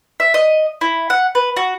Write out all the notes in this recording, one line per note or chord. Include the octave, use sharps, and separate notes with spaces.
E5
D#5
E4
F#5
B4
F#4